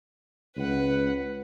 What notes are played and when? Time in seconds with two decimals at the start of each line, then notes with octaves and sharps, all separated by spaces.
0.56 C#2 B4 F#5